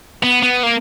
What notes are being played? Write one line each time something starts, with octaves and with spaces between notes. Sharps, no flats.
B3
B3
A#3